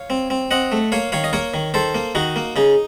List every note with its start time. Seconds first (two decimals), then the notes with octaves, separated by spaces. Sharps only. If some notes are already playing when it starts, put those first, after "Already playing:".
Already playing: C#5 F5
0.10 C4
0.30 C4
0.51 C4 D#5 F#5
0.72 A3
0.92 A#3 C#5 F5
1.12 D#3 C#5 F5
1.24 D#5
1.33 A#3 A#4 C#5
1.54 D#3
1.74 D#3 A4 C5
1.95 A#3
2.15 D#3 D#4 F#4
2.36 A#3
2.56 C#3 D#4